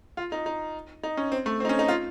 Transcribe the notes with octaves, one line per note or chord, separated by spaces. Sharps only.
F4
D#4
D#4
D#4
C#4
C4
A3
C4
D#4
C#4
D#4
F4